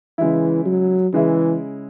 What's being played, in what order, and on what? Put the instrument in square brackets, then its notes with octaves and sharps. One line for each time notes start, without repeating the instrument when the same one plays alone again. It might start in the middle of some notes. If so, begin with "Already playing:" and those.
[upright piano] C#3 G#3 E4 [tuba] E3
[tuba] F#3
[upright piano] C#3 G#3 E4 [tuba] E3